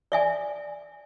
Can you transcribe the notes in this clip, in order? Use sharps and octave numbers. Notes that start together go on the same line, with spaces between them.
D5 E5 G#5